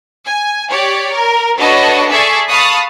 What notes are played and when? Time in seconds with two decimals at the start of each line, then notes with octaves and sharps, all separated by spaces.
0.25 G#5
0.68 G4 C#5 D5
1.13 A#4
1.58 D4 F#4 A4 B4 C#5 D#5
2.09 G#4 A4 D5 E5 G#5 C#6
2.48 F5 A5 B5 C#6 D#6 F#6